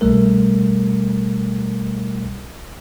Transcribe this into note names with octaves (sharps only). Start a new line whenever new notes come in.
C2 B2 G3 A3 A#4